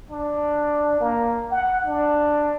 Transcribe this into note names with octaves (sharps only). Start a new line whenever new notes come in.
D4
A#3
F#5
D4